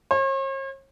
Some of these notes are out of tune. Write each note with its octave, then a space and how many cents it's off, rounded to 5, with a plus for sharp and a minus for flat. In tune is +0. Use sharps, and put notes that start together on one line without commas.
C#5 -45